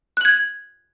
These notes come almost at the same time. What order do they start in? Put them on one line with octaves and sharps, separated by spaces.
F#6 F#7 G#6